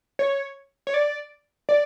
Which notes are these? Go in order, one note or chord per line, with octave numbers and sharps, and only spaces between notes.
C#5
C#5
D5
D5